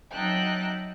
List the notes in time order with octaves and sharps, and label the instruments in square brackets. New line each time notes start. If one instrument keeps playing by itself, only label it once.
[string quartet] F#3 D#4 E5 G5 A5 F#6